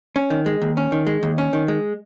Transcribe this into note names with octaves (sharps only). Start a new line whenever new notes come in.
C#4
D#3
G#3
D#2
C#4
D#3
G#3
D#2
C#4
D#3
G#3